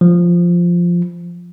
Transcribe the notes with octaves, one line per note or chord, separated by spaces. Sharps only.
F3